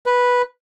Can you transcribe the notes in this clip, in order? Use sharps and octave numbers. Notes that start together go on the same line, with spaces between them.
B4